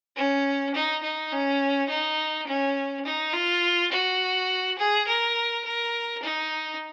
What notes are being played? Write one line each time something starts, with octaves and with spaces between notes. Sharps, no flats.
C#4
D#4
D#4
C#4
D#4
C#4
D#4
F4
F#4
G#4
A#4
A#4
D#4